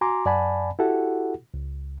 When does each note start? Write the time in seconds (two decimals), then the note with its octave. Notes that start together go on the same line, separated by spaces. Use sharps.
0.01 F#4 G#5 A#5 C6 D6
0.26 F#2 D5 F#5 G#5 A5 B5
0.79 E4 F#4 G4 A4 F#5
1.54 C#2